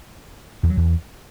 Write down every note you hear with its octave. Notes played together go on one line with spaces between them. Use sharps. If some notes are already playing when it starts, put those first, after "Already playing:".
E2
F#3
E2